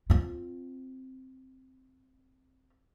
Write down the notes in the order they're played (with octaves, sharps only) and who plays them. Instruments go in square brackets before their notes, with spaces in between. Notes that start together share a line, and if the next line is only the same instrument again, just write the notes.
[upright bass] C4 F4